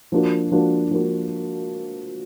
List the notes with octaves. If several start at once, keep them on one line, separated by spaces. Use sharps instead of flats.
F3 A#3 D4 F#4
F3 A#3 D4 F#4
F3 A#3 D4 F#4